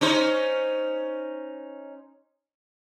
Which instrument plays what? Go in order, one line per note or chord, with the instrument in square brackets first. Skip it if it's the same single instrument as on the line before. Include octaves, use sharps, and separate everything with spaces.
[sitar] C#4 D#4 C5